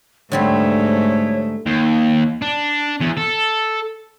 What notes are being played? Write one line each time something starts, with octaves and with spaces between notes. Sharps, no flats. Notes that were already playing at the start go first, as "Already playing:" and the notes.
G#2 D3 G3 A3 C4 C#5
D#2
D4
E2
A4